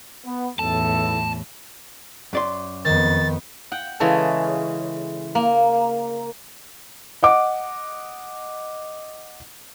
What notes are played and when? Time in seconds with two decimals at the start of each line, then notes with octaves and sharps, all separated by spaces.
0.25 B3
0.59 B1 E2 A2 E4 A4 A5
2.33 F#2 D5 C6
2.85 F2 D#3 B3 A6
3.72 F#5 G5
4.00 C#3 E3 G#3 C#4 A4
5.35 A#3
7.23 D#5 F#5 D6